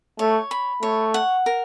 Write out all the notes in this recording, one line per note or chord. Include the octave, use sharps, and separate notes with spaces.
A3 C#5
B5
A3 C#5
F#5
A#4